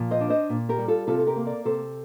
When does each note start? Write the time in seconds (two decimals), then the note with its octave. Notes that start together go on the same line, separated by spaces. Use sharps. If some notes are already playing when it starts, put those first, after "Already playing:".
Already playing: A#2 F3
0.11 C5 D#5
0.21 D4
0.30 C5 D#5
0.49 A#2
0.69 G4 A#4
0.78 G3
0.88 F4 A4
1.07 C3 F4 A4
1.19 A4
1.27 G4 A#4
1.36 A#3
1.47 A#4 D5
1.65 C3 A4 C5